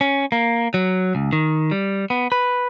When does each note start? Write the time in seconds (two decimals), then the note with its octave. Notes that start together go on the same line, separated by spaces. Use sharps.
0.01 C#4
0.32 A#3
0.74 F#3
1.15 C#2
1.33 D#3
1.71 G3
2.10 B3
2.32 B4